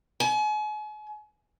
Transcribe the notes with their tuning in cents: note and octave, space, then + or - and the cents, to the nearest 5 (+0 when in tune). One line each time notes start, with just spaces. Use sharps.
G#5 +40